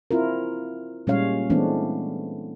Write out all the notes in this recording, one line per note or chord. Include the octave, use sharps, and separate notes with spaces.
C4 E4 F4 A#4
A#2 G3 G#3 C#4 C#5 F5
E3 G#3 A3 B3 C4 D4